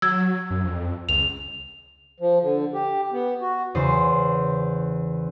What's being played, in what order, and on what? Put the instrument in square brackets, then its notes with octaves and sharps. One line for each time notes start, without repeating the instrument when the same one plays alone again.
[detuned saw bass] F#3 [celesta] E6 G#6
[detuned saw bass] F#2
F2
[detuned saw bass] C#2 [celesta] F7
[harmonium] F3
D3
G4
B3
F#4
[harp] E2 C#3 C5